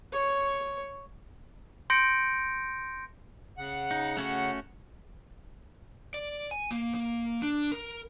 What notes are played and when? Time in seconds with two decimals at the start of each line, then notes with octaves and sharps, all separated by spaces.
0.13 C#5 C#6
1.90 C6 G6 A#6 C#7 D7
3.58 C#3 F#5
3.91 D#4
4.17 A3 C#4 F#4
6.14 D5
6.51 G#5
6.71 A#3
6.95 A#3
7.42 D4
7.72 A#4